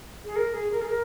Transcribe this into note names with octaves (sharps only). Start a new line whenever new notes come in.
G#4
A#4
G#4
A#4
G#4
A#4